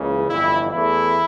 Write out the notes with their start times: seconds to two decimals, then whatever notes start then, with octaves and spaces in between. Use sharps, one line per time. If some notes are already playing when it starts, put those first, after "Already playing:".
Already playing: C#2 C#3 E3 A#3
0.29 G1 F2 E3 E4
0.73 E2 E3 A3 E4